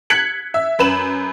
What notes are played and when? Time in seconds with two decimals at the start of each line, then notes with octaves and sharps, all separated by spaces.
0.10 F#6 G#6 B6 C#7 F#7
0.54 E5
0.79 F#2 B4 E7 F#7